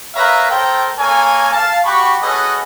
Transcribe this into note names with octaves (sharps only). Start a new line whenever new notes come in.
A#4 B4 C#5 E5 F5 A#5
A4 A#4 C5 G5
A#3 A4 A#4 C#5 G#5
F5 A5
F#4 G4 B5 C#6
C#4 F#4 G#4 A4 B4 D#5